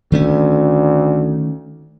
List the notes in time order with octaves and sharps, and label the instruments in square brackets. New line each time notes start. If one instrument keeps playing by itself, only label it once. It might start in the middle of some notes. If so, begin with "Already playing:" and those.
[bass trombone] D2 [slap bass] D#3 A3 C#4